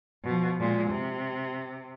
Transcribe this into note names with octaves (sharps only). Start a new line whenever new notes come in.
B2 F3
A#2 G#3
C3